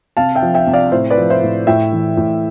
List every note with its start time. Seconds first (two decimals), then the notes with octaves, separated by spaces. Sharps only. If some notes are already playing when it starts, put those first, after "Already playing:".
0.17 C3 F5 A5
0.35 E5 G5
0.42 F3
0.54 E5 G5
0.67 C3
0.73 D5 F5
0.92 A2 C5 E5
1.10 B4 D5
1.17 F3
1.30 C5 E5
1.43 A2
1.67 A2 E5 G5
1.93 E3
2.17 A2